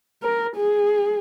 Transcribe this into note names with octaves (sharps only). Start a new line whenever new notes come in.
A#4
G#4